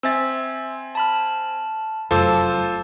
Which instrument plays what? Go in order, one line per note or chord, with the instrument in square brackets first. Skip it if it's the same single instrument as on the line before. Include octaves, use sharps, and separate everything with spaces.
[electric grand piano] C4 G#5 A6 [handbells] E5 E6
[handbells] A5 B5 F6
[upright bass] F1 F#2 [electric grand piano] F4 A4 C5 [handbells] A5 D6 E6